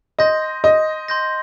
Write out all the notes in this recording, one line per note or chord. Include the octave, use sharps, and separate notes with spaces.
D#5 C6 G6 A#6
D#5
C6 G6 A#6